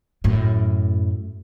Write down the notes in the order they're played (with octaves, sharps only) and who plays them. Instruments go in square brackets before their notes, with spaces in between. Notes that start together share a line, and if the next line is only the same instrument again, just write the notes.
[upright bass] F#2 A2